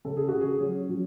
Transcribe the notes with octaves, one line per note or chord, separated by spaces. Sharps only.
C#3 A4
G#4
C#3 F#4
G#4
F#3 C#4
F#3